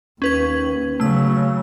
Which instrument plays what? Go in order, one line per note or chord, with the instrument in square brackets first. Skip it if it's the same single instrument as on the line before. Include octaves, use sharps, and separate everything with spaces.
[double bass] D#2 [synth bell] C#4 B4 G#6
[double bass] C#3 F#3 [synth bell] A3 E6